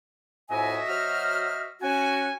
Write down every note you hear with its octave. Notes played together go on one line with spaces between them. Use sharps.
F2 A2 F#4 D#5 E5 G#5
F#3 C5 F6
C#4 F#4 G#5